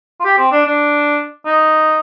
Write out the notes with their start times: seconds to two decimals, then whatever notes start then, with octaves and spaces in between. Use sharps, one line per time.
0.20 F4
0.25 G4
0.38 C4
0.52 D4
0.65 D4
1.45 D#4